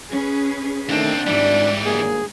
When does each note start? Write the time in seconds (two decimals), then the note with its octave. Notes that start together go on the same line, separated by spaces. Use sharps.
0.12 C#4 G#4 B4
0.89 D#2 D#3 A3 C4 D4
1.27 G#1 G#2 E3 G3 E4 D5
1.84 G1 F#3 A#3 G#4